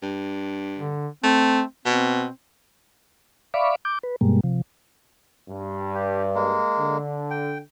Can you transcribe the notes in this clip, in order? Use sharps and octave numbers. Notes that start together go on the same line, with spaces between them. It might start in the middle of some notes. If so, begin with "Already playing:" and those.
G2
D3
A3 C4
B2 C4
D5 E5 F5 B5 C#6 D6
D6 G6
B4
G2 B2 G3 G#3 A#3
C3 F3
G2
G4
G#3 A#3
D3
G5